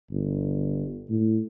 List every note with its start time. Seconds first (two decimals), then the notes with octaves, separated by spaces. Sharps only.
0.11 G1
1.09 A2